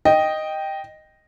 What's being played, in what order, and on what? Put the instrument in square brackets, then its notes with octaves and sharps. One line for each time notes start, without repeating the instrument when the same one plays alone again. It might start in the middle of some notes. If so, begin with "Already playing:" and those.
[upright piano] D#5 G5